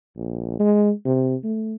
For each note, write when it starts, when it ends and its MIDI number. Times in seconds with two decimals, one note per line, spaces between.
0.17 0.56 34
0.59 0.91 56
1.05 1.35 48
1.43 1.76 57